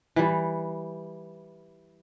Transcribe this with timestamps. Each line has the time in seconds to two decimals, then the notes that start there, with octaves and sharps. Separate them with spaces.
0.16 E3 G3